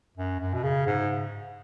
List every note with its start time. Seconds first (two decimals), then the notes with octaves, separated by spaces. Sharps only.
0.17 F#2
0.40 F#2
0.54 B2
0.63 C#3
0.86 G#2